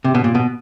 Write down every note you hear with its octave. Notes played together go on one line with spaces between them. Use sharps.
C3
B2
A#2
B2